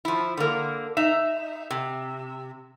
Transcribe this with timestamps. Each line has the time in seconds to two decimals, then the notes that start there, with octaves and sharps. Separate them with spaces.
0.05 F3 E4
0.37 D3 A#3
0.97 D#4 E5
1.70 C3